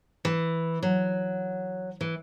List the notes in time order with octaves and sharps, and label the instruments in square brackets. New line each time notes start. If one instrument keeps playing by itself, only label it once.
[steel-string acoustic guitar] E3
F#3
E3